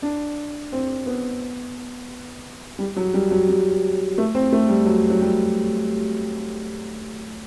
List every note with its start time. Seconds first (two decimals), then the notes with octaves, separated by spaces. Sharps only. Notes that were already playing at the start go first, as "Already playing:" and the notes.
0.02 D4
0.72 C4
1.06 B3
2.79 G3
2.96 F#3
3.14 G3
3.31 F#3
3.49 G3
4.18 A3
4.35 C4
4.52 A3
4.69 G3
4.86 F#3
5.10 F#3
5.21 G3